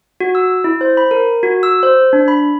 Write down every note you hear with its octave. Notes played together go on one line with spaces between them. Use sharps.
F#4
E6
E4
C5
B5
A#4
F#4
E6
C5
D4
B5